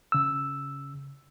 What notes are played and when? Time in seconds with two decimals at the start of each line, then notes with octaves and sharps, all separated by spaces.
0.12 C#3 E6